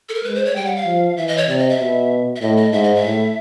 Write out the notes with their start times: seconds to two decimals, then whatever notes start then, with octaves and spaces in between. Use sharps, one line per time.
0.09 A4
0.14 A#4
0.24 G#3 B4
0.35 C5
0.45 C#5
0.56 G3 G5
0.66 F#5
0.76 F5
0.86 F3
1.17 E3 E5
1.28 D#5
1.37 C#5
1.48 C3 D5
1.58 D#5
1.69 E5
1.79 B2
2.36 E5
2.41 A2 D#5
2.57 D#5
2.72 G#2 E5
2.84 D#5
2.95 E5
3.03 A2